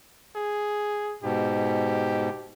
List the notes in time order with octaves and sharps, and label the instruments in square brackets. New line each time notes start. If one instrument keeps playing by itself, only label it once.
[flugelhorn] G#4
[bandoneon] G#2 B2 [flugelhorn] G4